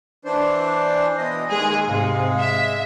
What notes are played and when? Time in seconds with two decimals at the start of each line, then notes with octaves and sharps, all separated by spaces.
0.25 E3 D4 C5
1.18 B2 E3 D#5
1.50 D#2 G#3 G#4
1.87 G#2 C3 G#3 F5
2.38 E5